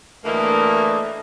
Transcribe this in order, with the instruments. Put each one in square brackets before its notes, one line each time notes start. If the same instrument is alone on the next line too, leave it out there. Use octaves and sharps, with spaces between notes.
[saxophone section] D2 E3 A#3 [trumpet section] A3 D4 D#5